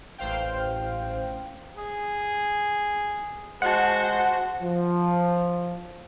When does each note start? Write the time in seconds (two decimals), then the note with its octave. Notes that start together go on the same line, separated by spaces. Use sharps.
0.18 A1 C5 F5 G5
1.77 G#4
3.62 G#3 F#4 C5 F#5 A5
4.62 F3